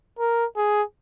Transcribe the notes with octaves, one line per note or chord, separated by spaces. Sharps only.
A#4
G#4